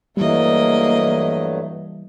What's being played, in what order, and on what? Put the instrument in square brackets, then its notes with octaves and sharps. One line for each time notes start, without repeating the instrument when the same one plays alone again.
[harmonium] G2 F#3 A3 [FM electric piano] E3 G3 [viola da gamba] A#3 D#5